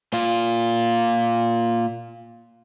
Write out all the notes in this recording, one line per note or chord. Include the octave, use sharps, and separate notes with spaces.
A#2 F4